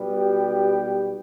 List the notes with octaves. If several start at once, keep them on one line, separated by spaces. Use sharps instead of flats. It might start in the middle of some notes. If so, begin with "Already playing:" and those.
Already playing: B1 B2 G3 B3
G4